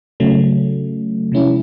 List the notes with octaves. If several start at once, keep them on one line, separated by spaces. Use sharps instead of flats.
C#3 F#3 A3
C3 F3 G#3 C#4 E4